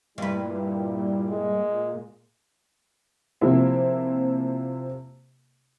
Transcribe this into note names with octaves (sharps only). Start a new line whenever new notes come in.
G2 A#2 G3 E4 B4
G#3
C3 F3 A#3 C4 E4 G4